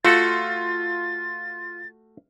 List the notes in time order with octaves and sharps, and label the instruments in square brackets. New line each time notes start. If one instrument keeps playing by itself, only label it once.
[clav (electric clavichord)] A3 F#4 A4 [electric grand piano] F4 [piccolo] A6